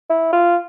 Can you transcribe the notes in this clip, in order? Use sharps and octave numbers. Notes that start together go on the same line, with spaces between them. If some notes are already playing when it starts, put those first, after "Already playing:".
E4
F4